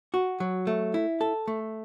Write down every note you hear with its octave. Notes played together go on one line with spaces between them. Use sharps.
F#4
F#3
A3
E4
A4
A3